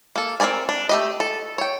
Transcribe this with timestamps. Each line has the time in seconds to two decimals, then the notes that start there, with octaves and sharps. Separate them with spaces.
0.16 A#3 A4
0.40 C4 F#4 A#4 D5 G#5
0.69 D4
0.89 A3 G4 D#5
1.20 A4
1.58 C#5 G5